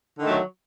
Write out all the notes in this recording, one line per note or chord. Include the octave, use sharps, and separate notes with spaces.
D3 D#3 F#3 A3